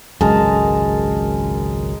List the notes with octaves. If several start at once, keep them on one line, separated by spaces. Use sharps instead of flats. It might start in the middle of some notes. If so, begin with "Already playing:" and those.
G#1 C#2 F#2 G#3 A#4 A5